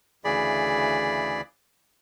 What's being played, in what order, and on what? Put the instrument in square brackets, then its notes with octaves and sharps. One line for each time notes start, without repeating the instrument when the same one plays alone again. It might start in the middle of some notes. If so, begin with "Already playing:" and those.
[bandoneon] D2 C#3 E3 G#4 D5 B5